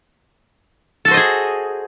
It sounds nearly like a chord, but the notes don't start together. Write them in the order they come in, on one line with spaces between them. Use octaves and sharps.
A4 F#4 C5 D#5 G#4